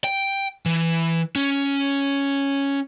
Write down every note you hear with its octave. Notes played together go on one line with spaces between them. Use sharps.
G5
E3
C#4